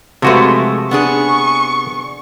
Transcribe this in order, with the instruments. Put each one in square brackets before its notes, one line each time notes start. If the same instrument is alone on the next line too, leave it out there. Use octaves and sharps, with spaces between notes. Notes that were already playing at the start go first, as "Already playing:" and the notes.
[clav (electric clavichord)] C3 F#4 B4 [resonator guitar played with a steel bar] F3 G#3 A3
[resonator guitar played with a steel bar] B3 D4 G#4 [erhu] C#6